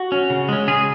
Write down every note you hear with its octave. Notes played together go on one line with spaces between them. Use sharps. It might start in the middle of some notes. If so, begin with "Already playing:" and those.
Already playing: F#4
C#4
C#3
G#3 C#4
C#3 G#4